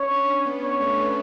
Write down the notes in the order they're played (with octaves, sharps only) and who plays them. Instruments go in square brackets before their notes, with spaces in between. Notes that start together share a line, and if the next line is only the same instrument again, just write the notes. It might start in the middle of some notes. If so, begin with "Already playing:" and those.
Already playing: [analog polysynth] C#4 [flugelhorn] C#5
[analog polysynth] D4
C#4
B3
[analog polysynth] B3 [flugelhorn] C#5
[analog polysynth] A3
C#4
B3